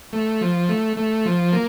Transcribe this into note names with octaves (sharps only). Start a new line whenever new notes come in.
A3
F3
A3
A3
F3
A#3